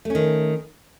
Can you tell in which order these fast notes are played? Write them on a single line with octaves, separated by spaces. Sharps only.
A3 C#4 D#3